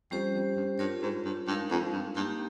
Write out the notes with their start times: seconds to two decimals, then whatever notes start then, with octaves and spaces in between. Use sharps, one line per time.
0.11 F2 G3 C#4 G4 C5
0.34 F2
0.56 G2
0.79 G2 F4 A#4 C#5
1.02 G#2
1.25 G2
1.47 G2 G#3 D#4 A#4 F5
1.71 F2
1.93 G2
2.15 G2 A#3 D#4 G4